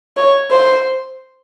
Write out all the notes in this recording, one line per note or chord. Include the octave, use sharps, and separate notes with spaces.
C#5
C5